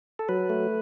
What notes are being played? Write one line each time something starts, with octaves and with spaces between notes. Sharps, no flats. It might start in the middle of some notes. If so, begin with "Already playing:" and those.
A4
F#3 B4
A3